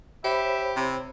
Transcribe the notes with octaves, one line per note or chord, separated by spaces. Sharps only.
G4 C5 C#5 E5 B5
C3 E4